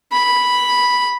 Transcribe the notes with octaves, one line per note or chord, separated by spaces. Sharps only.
B5